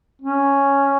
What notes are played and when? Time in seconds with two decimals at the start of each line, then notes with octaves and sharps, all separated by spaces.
0.22 C#4